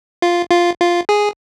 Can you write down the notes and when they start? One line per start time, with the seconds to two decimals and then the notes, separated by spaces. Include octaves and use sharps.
0.22 F4
0.50 F4
0.80 F4
1.09 G#4